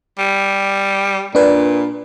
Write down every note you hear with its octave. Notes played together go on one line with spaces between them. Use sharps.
G3
A#2 D4 B4